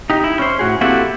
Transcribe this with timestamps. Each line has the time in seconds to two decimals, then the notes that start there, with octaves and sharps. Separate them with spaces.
0.10 D#4 G4
0.24 E4
0.39 C#4 C5
0.59 A2 F#4 G#4
0.81 A#3 C4 E4 F#4 G4 A4